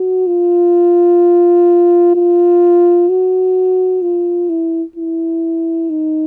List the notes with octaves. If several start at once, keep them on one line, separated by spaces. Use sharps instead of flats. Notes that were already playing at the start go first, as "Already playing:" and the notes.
Already playing: F#4
F4
F4
F#4
F4
E4
E4
D#4